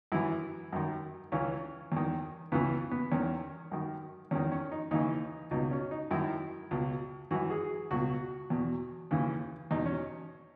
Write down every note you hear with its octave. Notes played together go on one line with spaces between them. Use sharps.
F#2 E3 E4
F#2 D#3
C#2 C#3 E3 C#4
E2 D#3
C#2 C#3 E3 B3
B3
E2 D#3 C#4
F#2 D#3
E2 D#3 C#4
C#4
D#4
D#2 C#3 E3 D#4
C#2 B2 D#4
C#4
D#4
F#2 D#3 E4
C#2 B2
F#2 E3 F#4
G#4
C#2 B2 F#4
E2 B2
D#2 C#3 E3
E2 B2 D#4
C#4